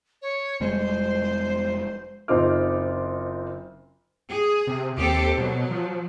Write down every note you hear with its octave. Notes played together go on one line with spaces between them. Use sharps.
C#5
F1 G3 G#3 C5
F#1 C4 D#4 F4 D6 F6
G#4
C3
D#2 C4 G4 A4
B2 F#3
F3